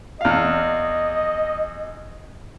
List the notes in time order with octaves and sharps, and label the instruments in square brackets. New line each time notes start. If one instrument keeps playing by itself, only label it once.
[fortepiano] E2 F5 [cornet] D#5